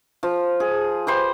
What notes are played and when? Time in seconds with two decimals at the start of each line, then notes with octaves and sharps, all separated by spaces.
0.23 F3
0.60 G#4
1.07 G4 B4 C5 G5